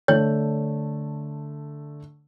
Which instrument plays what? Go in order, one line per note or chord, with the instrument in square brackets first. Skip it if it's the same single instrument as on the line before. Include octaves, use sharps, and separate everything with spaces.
[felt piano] D3 A3 [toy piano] C#5